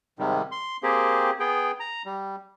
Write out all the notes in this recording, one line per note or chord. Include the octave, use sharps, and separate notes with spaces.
G#2 C3 D#3 G3
C6
A#3 C4 G4 G#4
B3 G#4 G5
A#5
G3